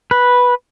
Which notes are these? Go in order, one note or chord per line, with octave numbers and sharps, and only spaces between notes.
B4